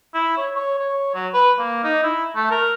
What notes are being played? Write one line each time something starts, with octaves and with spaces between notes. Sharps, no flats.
E4
C#5
C#5
C#5
F#3
B4
A#3
D#4
E4
A3
A#4